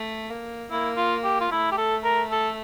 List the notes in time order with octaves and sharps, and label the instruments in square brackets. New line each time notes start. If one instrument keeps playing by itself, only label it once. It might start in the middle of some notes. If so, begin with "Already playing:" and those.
Already playing: [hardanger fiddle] A3
A#3
[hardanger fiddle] A#3 [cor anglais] E4
[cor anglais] F4
G4
F4
[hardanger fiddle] A3 [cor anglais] E4
[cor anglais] G4
A4
A#4
A4